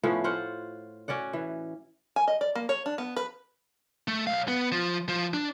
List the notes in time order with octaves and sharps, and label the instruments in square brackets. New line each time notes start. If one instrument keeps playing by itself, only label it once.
[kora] A2 F3 B3 C#4
F4 C5 F#5
C#4 F#4 D5 F#5
E3
[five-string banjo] G#5
D#5
D5
A#3
C#5
D4
B3
B4
[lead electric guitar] A3
B1 F5
B3
F3
F3
D4